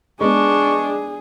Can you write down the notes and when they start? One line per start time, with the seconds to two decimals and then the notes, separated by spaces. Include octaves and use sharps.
0.21 G#3 B3 D4 G#4 C#6